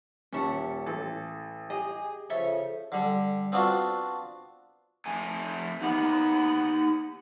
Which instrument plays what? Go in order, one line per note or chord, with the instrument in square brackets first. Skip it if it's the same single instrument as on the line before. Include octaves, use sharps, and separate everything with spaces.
[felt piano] D#1 A5 [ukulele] C#4 E5 F#5
[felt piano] A1 [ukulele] A4
[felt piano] G4 [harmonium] G#4 [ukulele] D#5
[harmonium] C#3 F3 [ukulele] A4 C#5 E5
[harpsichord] D3 G3
B3 C4 D4 F4 F#4
[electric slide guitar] F2 A3 G#5
[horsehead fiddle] B3 F#5 [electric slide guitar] D#4 G4